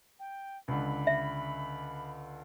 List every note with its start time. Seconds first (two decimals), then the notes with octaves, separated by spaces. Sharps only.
0.20 G5
0.68 C#2 D3 B5
1.07 E5